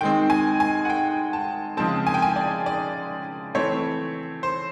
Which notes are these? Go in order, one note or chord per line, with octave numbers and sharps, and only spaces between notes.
D#3 G#3 C4 G5
G#5
G#5
F#5
G5
A5
C#3 F3 G#3 C4 A5
G#5
G5
G#5
D5
D5
E3 A3 C4 C#5
C5